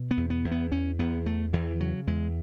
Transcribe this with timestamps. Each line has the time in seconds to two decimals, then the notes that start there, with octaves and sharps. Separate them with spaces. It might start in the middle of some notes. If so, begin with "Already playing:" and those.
Already playing: B2
0.11 B3
0.17 E2
0.30 B3
0.44 E2
0.51 B3
0.71 E2 C#4
0.99 E2 B3
1.26 E2 A3
1.53 E2 E3
1.80 C#3 F#3
2.07 E2 G#3